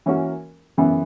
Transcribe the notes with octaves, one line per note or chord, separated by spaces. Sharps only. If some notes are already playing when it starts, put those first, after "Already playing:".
E3 A#3 C#4 F#4 A#4
F#2 C#3 E3 B3